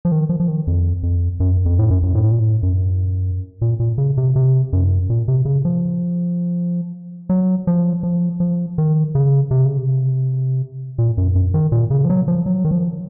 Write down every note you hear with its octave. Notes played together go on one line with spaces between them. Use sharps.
F3
D#3
F3
F3
D#3
F2
F2
F#2
F2
A2
F#2
F#2
A2
A#2
A2
F#2
A#2
A#2
C#3
C3
C3
F#2
A#2
C3
C#3
F3
F#3
F3
F3
F3
D#3
C#3
C3
C#3
C3
A#2
F#2
F#2
D#3
A#2
C#3
F3
F#3
F3
F#3
D#3
F3